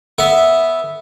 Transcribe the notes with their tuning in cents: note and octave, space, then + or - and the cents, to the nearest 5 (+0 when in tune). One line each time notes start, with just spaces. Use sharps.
B3 +0 E5 -5